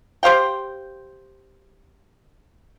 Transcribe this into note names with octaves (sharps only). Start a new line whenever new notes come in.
G4 C5 F5 G5